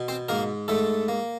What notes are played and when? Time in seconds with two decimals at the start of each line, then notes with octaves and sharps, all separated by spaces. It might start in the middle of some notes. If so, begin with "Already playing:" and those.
Already playing: B2
0.08 C4 C5
0.29 G#2 A#3 A#4
0.68 G#2 A3 A4
1.08 A#3